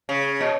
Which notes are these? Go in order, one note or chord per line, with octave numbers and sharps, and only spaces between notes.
C#3
B2